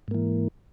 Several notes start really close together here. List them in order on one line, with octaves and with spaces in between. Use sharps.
G#2 A#3 E3